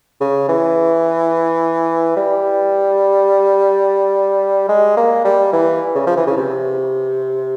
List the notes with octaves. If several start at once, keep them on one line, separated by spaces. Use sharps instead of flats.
C#3
E3
G3
G#3
A#3
G3
E3
C#3
F3
E3
C#3
C3